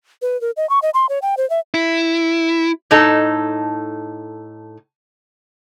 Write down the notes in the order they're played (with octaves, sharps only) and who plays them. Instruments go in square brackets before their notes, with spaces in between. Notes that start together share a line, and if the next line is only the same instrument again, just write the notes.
[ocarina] B4
A#4
D#5
C#6
D#5
C6
C#5
G5
C5
E5
[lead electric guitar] E4
[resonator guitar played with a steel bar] A2 D#4 A4